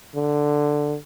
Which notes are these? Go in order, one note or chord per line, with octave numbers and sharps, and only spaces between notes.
D3